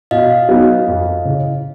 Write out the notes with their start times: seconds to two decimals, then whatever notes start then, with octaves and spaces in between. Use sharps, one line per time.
0.11 B2 D#5 F5
0.49 F#3 B3 D#4
0.87 F2
1.25 C#3 E3